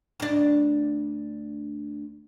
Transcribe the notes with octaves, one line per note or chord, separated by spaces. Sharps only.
D2 D4